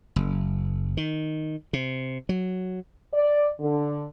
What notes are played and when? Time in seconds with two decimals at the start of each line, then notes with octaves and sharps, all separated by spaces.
0.16 F#1
0.97 D#3
1.73 C3
2.29 F#3
3.13 D5
3.60 D3